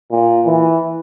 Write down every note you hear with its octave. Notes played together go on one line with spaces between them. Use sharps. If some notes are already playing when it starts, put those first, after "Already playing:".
A#2
E3